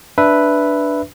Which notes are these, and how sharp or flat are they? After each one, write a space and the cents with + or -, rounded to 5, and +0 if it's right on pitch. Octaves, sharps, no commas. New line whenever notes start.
D4 +0 B4 +0 E5 +0